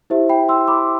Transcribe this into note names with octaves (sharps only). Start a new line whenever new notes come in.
E4 G4 C5 E5
G5 B5
C6 E6
B5 D6